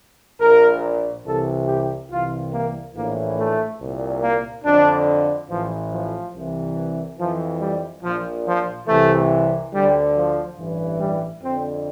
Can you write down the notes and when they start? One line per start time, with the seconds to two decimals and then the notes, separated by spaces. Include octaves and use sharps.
0.40 A#1 A#2 A#4
1.25 C2 C3 E3 A4
1.67 G4
2.10 C2 C3 E3 F4
2.52 A#3
2.94 A#1 A2 E3 A#3
3.37 A3
3.80 C2 A#2
4.21 A#3
4.64 F2 D3 D4
5.49 A1 A2 E3 F3
5.91 F3
6.34 C2 C3 E3
7.18 F2 E3 F3
7.60 G3
8.03 A#1 A#2 F3
8.45 F3
8.87 C2 C3 E3 A3
9.73 D2 D3 G3
10.15 F3
10.57 A1 G2 E3
10.99 G3
11.42 F2 D3 C4